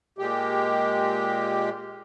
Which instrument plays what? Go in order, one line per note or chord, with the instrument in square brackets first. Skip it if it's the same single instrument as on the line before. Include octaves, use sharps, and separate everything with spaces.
[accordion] A#2 G#3 G4